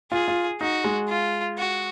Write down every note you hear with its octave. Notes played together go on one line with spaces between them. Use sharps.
F4 G#4
F4
D#4 F#4
G#3
F4
F#4